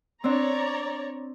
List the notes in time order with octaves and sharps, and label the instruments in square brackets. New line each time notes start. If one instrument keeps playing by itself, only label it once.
[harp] C4 D4 [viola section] C#5 D5 A#5